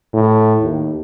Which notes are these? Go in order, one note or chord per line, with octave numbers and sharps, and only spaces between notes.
A2
D#2